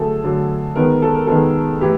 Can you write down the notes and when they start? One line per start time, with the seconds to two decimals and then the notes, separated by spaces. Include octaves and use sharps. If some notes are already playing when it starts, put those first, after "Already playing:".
Already playing: D3 F#3 A3 G#4 A4
0.24 D3 F#3 A3
0.76 D#3 G#3 B3 A#4
1.02 A4
1.14 A#4
1.27 D#3 G#3 B3 A4
1.81 A2 E3 G4